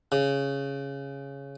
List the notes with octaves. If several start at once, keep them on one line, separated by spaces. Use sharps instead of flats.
C#3